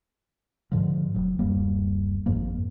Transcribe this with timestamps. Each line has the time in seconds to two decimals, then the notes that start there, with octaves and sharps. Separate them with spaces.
0.72 G#2 D3 F3
1.14 F1 B1 F#3
1.39 D1 F#2 G3 A#3
2.26 G#1 F2 G#2 A#3